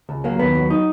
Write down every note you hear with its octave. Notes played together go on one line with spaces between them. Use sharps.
C#2
F#3 A#3
D#2 B3
F#3
D#4